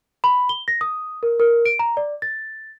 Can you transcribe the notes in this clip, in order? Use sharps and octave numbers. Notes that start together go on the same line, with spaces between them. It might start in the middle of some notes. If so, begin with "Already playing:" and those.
B5
G7
A#6
D#6
A#4
A#4
D7
A#5
D5
A6